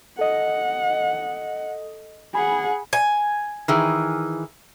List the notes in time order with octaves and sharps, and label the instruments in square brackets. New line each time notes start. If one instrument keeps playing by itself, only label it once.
[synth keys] A4 D#5 [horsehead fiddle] F#5
[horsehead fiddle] G#4 F#5 [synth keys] G#5 B5
[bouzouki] G#5
[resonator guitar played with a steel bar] D#3 E3 G#4